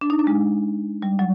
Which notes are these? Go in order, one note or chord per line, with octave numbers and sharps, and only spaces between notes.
D4
D#4
D4
G#3
G3
F#3